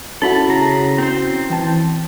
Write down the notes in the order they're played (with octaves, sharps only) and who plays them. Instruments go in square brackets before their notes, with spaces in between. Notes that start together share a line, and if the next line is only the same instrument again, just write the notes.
[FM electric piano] C#4 E4 F#4 [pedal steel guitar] A4 B5
[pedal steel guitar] C#3 A#5
C4 C5
[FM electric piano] E3 G5 A5